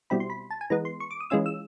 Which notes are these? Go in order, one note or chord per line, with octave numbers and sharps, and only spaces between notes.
B2 G3 C4 E4 B5
C6
B5
A5
G#5
E3 G#3 B3 A#5
C6
C#6
D6
D#6
E3 G#3 C#4 F4 E6
E6